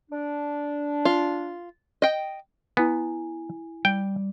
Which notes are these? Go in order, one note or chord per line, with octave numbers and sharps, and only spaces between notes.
D4
F4
D#5 G5
B3 E4 G#5
G3 G5